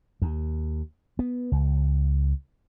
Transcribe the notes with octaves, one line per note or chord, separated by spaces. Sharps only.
D#2
B3
C#2